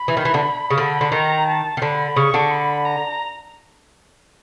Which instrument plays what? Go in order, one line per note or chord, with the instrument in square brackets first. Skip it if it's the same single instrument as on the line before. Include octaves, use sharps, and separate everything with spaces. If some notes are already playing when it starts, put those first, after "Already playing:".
Already playing: [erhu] B5
[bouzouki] E3
D#3
E3
D3
C#3
[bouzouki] D3 [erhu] B5
[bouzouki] D3
[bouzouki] D#3 [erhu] A#5
[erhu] A5
[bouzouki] D#3
[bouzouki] D3 [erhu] B5
[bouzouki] C#3 [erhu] C#6
[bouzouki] D3
[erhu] B5
A#5